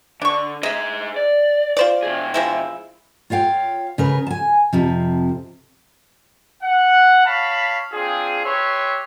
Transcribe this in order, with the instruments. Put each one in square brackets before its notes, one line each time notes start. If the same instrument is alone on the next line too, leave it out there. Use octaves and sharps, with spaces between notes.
[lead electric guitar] D3 [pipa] D4 C#6
[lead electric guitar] G#4 C5 [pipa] D#5 E5
[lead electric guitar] D5
[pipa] F4 C5 D5
[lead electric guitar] B2 G#4
[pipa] F3 G#3 E4
[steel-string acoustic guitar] F4 C#5 F5 G5
C#3 A#4 B4
G#5 A5
F2 C3 F3
[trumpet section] F#5
C#5 F5 A5 B5
C4 D4 F4 G#4
G4 B4 C#5 E5 C6